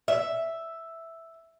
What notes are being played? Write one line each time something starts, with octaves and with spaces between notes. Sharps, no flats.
E5